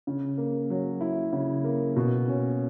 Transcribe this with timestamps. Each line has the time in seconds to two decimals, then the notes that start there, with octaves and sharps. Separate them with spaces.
0.07 C#3
0.38 A#3
0.70 F#3
1.01 E4
1.33 C#3
1.64 A#3
1.96 B2
2.28 C#4